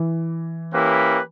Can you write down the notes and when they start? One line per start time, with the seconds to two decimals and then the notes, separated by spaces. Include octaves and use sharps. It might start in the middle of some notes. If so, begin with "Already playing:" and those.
Already playing: E3
0.74 A#3 C#4 E4 G4 B4